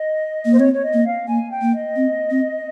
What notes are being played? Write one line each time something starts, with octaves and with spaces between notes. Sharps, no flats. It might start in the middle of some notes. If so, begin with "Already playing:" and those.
Already playing: D#5
A#3
C5
C4 C#5
C#5
D#5
A#3
F5
A#3 G#5
G5
A#3
D#5
C4
C4